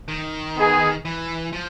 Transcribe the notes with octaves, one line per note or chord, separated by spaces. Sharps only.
D#3
B3 D#4 G#4
E3
F3